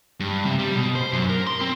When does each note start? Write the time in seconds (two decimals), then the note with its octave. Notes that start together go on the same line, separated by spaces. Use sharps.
0.20 G2
0.46 C3
0.59 G3
0.76 B2
0.96 C5
1.13 F#2
1.30 A#4
1.47 C6
1.61 C4